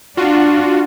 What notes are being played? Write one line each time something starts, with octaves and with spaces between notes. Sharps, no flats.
D4 F4 F#4